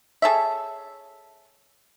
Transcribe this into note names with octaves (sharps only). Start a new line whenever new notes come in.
G#4 A4 C#5 E5